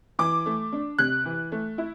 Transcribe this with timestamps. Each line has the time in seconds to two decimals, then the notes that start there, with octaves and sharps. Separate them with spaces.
0.19 E3 D6
0.46 A3
0.72 D4
0.99 C3 F#6
1.25 E3
1.52 A3
1.78 E4